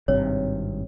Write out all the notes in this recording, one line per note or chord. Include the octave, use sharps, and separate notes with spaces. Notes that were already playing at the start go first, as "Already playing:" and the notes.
G#1 G2 C3 C#5